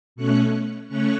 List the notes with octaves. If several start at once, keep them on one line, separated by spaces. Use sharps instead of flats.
B2 A3 C#4 C#6 F#6
C#3 A3 C#4 C#6 F#6